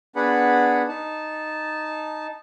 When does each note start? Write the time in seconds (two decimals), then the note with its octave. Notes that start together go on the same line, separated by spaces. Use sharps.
0.16 B3 D4 G#4 B4 F#5 B5
0.88 D#4 A5